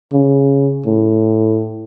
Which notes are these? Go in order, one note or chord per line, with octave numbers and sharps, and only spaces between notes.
C#3
A2